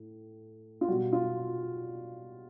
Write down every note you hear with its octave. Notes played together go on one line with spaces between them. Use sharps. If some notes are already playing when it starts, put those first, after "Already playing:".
Already playing: A2
F4
B2 G3 F#4
F4